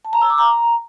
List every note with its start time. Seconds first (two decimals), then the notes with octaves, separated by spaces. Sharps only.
0.05 A5
0.13 A#5
0.21 E6
0.30 D6
0.38 A#5